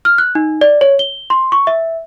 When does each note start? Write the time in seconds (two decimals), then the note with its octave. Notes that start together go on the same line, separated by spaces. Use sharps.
0.05 F6
0.18 F#6
0.35 D#4
0.61 D5
0.81 C#5
0.99 G7
1.30 C6
1.52 C#6
1.67 E5